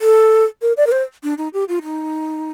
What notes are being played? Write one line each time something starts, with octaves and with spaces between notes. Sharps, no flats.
A4
A#4
D5
A#4
C5
D4
D#4
G4
F4
D#4